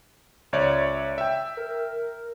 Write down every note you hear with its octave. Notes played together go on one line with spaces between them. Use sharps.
C#2 C#5 D5 E5
E5 G5
A#4